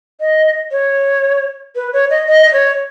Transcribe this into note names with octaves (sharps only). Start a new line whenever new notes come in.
D#5
C#5
B4
C#5
D#5
D#5
D#5
C#5